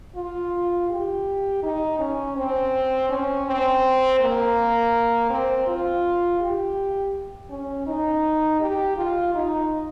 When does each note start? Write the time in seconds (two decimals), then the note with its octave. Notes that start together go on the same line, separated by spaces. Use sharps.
0.15 F4
0.90 G4
1.63 D#4
1.99 C#4
2.36 C4
3.09 C#4
3.46 C4
4.19 A#3
5.30 C4
5.67 F4
6.40 G4
7.50 C#4
7.87 D#4
8.60 G4
8.97 F4
9.34 D#4